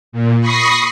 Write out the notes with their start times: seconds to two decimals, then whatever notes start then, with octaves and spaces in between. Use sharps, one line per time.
0.12 A#2
0.40 B5 C#6 D#6 A#6 C7